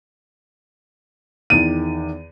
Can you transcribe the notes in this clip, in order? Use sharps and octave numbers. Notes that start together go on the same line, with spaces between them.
E2 D#3 D#7